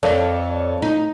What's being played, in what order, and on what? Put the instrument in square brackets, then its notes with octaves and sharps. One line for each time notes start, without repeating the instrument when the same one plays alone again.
[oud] F2 [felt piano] A4 C#5 D5
[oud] D#4